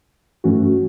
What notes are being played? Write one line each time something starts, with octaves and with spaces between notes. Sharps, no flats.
G2 E3 A3 C#4 F#4